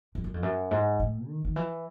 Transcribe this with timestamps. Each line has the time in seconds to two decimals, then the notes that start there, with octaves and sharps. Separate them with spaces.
0.15 F2
0.24 F#2
0.34 F2
0.43 F#2
0.71 G#2
1.00 A2
1.28 D#3
1.45 D#3
1.56 E3